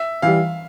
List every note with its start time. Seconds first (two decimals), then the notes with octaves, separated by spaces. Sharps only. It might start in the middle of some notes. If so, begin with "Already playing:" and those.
Already playing: E5
0.22 E3 G3 F5